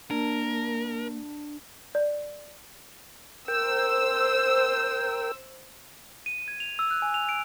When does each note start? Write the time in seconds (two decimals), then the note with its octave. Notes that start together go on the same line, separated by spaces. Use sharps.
0.11 A#3 D4 A#4
1.95 D5
3.48 A#4 C5 G5 E6
6.26 D#7
6.48 G#6
6.60 F7
6.79 E6
6.91 F#6
7.02 G#5
7.14 F7
7.29 D7